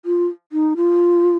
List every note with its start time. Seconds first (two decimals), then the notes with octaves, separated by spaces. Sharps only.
0.05 F4
0.52 D#4
0.77 F4